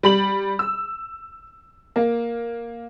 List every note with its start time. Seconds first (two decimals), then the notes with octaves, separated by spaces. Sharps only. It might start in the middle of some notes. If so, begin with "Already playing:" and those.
0.03 G3 B5 F#7
0.59 E6
1.96 A#3